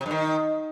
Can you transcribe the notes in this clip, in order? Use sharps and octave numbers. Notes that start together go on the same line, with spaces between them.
C3
G2
D#3